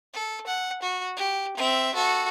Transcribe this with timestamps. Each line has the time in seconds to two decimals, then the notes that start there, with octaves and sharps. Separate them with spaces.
0.13 A4
0.47 F#5
0.82 F#4
1.16 G4
1.57 C4 E5
1.94 F#4 A4